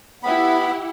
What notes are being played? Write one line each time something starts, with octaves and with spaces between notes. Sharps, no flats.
B3 E4 G4 F#5 B5